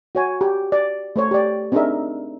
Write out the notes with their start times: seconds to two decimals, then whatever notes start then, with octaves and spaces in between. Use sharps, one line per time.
0.15 F#4 C#5 G#5
0.41 G4
0.72 D5
1.16 A3 C5 C#5
1.31 G4 D5
1.72 C4 D4 D#4 G#4 A#4 E5